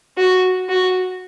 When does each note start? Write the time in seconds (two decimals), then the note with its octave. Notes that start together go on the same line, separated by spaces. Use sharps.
0.17 F#4
0.68 F#4